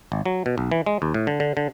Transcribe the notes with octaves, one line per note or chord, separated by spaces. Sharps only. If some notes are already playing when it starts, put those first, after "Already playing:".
G#1
F#3
B2
B1
E3
G#3
D#2
A2
D3
D3
D3